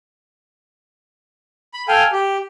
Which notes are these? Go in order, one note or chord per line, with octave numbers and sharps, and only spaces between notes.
B5
A4 F5 G5 G#5
G4